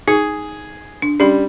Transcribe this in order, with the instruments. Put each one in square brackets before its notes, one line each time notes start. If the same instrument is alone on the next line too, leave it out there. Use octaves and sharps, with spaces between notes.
[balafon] D#4 [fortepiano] G#4
[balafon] D4
[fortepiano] G3 [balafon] C#4 D4 G4